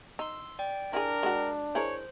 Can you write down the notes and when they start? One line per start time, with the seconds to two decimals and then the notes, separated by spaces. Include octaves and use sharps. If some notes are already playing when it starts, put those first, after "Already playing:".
0.19 D#4 C6 E6
0.59 D5 G5
0.93 D4 E4 G4 G#4 A#4
1.23 G#3 F#4
1.75 E4 G#4 A#4 C5 C#5